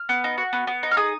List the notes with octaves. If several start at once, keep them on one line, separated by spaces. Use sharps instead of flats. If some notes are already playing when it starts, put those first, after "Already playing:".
Already playing: F6
B3
D#4
F#4
B3
B3
D#4
F6
G#4 D#6